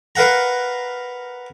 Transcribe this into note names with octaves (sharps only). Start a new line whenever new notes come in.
A#4 B4 F5 F#5 A#5